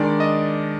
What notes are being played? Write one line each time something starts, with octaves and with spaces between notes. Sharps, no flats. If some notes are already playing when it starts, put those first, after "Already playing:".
Already playing: D#3 G#3 D4 D5
D#5